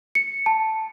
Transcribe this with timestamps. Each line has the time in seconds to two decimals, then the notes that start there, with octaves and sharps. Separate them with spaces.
0.15 C#7
0.46 A5